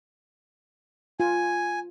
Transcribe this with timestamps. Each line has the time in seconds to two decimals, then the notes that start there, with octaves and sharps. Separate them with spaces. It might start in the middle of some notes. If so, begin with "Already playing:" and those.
1.20 F4 G#5